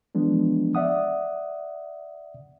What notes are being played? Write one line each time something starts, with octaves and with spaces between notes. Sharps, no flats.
E3 F3 G#3 B3 D4
D5 E5 F#5 D#6